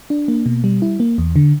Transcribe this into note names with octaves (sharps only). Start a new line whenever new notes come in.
D4
A#3
B2
G3
E4
A#3
E2
D3